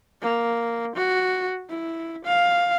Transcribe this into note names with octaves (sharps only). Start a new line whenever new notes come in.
A#3
F#4
E4
F5